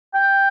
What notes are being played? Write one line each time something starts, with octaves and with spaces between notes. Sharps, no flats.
G5